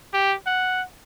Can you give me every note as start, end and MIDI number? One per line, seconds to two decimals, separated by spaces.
0.13 0.34 67
0.46 0.82 78